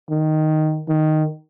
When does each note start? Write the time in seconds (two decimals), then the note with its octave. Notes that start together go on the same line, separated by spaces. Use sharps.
0.10 D#3
0.89 D#3